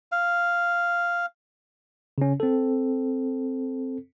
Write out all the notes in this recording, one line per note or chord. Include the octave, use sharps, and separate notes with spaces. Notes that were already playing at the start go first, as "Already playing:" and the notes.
F5
C#3 C#4
C4 A4